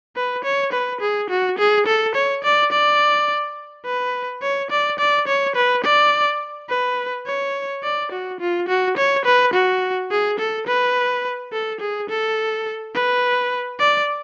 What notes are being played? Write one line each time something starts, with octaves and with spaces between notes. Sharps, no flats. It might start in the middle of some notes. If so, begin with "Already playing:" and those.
B4
C#5
B4
G#4
F#4
G#4
A4
C#5
D5
D5
B4
C#5
D5
D5
C#5
B4
D5
B4
C#5
D5
F#4
F4
F#4
C#5
B4
F#4
G#4
A4
B4
A4
G#4
A4
B4
D5